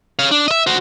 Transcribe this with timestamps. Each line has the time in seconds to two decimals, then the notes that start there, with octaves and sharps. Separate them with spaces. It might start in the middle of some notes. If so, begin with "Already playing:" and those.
0.19 C#5 F5
0.31 D4
0.48 D#5 E5
0.67 F#4 C5